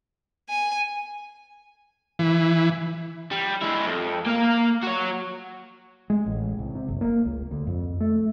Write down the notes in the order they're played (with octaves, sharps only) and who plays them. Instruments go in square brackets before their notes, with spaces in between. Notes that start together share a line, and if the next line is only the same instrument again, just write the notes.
[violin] G#5
[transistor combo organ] E3
[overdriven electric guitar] G3
G#3 E4
F2
A#3 F5
F#4 C#5
[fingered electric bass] G#3
A1
C2
C3
F#1
A#3
C#2
D2
F2
A3